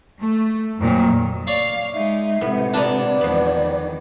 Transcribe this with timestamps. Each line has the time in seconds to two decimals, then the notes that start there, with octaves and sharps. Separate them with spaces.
0.21 A3
0.80 F2 A#2 D#3 F#3
1.47 C#5 D5 F5
1.93 G#3 D#4 E5
2.41 A2 C3 G#3 B3
2.74 A#2 B3 D4 D5 A#5
3.21 E2 D#3 F3 B3